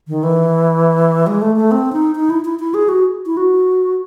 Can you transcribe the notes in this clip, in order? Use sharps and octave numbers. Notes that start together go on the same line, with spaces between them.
D#3
E3
G#3
A3
A3
C4
D#4
D#4
E4
E4
E4
G#4
F#4
E4
F#4